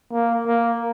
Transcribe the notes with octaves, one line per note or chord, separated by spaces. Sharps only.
A#3
A#3